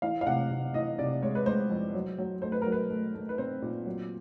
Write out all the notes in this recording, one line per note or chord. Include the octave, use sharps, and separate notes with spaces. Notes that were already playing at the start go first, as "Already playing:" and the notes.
E3 F5
F5
C3 F#5
C3
E3 D#5
C3 D5
G#3 C#5
B4
G#3 C5
F2
F#3
F#3
A3 C5
B4
A#4
F#3
B4
A3
A3
B4
C4 C5
A#2
F#3